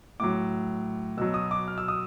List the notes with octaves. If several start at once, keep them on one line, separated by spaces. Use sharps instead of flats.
A2 F#3 D6
B2 F#3 E6
D#6
D6
F6
E6
D#6